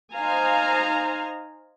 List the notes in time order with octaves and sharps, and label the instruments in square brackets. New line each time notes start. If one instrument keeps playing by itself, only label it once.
[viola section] D#4 C5 F5 G#5 A#5